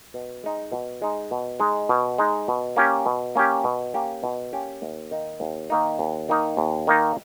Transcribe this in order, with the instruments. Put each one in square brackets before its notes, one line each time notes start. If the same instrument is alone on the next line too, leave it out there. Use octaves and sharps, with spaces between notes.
[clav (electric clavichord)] B2
G#3 D#4
B2
G#3 D#4
B2
G#3 D#4
B2
G#3 D#4
B2
A#3 C#4 G4
B2
A#3 C#4 G4
B2
A#3 C#4 G4
B2
A#3 C#4 G4
D#2
D#3 A#3 D#4
D#2
D#3 A#3 D#4
D#2
D#3 A#3 D#4
D#2
D#3 A#3 D#4